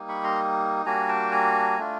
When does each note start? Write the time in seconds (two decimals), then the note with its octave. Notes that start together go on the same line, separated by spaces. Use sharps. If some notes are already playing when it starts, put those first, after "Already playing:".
Already playing: G3 A#3 D#4
0.09 B5 C#6
0.24 A#5 C6
0.85 G3 A#3 D4 F#4 G#5 A#5
1.09 G5 A5
1.32 G#5 A#5
1.78 A3 D4 F4